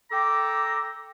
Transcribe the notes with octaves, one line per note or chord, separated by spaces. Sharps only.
A4 G5 A#5 D6